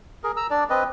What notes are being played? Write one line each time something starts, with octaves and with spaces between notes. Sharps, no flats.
G#4 A#4
A#5 E6
D4 D5
C4 B4 D#5